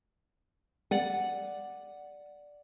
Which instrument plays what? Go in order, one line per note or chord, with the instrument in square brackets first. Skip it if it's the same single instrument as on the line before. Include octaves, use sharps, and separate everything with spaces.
[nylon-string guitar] D5 F#5